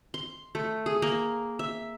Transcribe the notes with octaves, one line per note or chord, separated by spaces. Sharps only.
C6
A3
G#4
A#3
E5